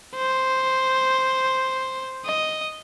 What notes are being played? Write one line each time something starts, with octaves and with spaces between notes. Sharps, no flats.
C5
D#5